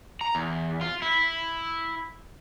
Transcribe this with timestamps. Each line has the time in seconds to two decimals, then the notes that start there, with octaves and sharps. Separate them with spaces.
0.21 A#5
0.35 E2
0.81 F4
1.02 E4